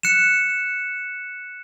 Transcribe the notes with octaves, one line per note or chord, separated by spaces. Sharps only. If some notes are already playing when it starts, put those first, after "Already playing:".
F#6 C#7 E7